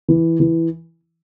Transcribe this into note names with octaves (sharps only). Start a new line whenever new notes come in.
E3
E3